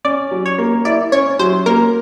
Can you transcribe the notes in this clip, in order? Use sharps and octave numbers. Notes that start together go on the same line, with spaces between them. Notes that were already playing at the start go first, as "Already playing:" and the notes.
C#4 D5
F#3
C#5
A#3
E4 D5
C#4 C#5
F#3 C5
A#3 A#4